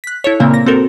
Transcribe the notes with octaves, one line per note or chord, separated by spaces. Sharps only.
F#6 B6
E4 A4 C#5
A#2 C#3 A#3 C4
A#6
C4 F#4 A4 A#4